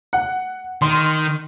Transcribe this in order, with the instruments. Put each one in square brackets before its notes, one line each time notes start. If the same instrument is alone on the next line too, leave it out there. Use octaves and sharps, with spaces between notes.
[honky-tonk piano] F#5
[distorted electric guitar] D#3 [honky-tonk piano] C6